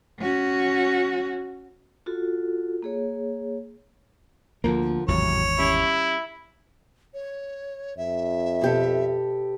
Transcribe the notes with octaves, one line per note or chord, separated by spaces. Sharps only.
C#4 F#4
F4 F#4 A4
A#3 G#4 C#5
D2 D3 F3 A#3 A#4
G#1 E2 A2 C3 F#3 C#5
G3 C#4 E4
C#5
F2 E5
B2 G4 A4